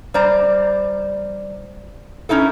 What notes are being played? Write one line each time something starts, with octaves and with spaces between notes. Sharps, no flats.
G3 C5 D5 A#5
C#4 D#4 E4 A4